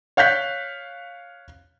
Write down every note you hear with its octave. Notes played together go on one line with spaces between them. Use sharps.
C#5 F5 F#6 G6 B6